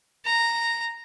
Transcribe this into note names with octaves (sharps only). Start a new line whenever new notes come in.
A#5